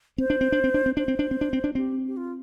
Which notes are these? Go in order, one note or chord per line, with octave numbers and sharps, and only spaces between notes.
C4 C5
D4
C4
D4
C4
D4
C4
D4 C5
C4
D4
C4
D4
C4
D4
C4 G4
G4
F4